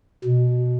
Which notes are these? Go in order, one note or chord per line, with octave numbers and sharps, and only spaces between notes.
B2